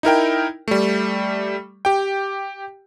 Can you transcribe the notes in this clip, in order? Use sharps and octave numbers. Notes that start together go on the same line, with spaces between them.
D#4 E4 A#4 G5
G3 A3
G4 G5